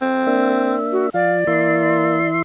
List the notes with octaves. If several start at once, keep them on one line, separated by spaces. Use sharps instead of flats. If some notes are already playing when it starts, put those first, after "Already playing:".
C4
A#3 D4 E5
F#4
F3 D5 F5
E3 A#3 E5 C6